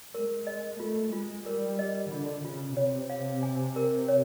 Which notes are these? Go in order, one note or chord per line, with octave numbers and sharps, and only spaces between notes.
G#3 A#4
D#5
A3 F4
G#3 F4
G3 A#4
D#5
D3 F4
C#3 F4
C3 C#5
F5
G#5
A#4
C#5